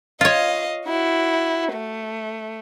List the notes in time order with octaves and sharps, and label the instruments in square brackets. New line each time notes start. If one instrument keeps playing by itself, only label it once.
[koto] F4 C#5 [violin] D#5 F5
[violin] E4 F#4
A3